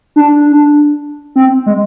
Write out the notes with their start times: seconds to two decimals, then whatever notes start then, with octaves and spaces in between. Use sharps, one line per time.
0.16 D4
1.36 C4
1.66 G#3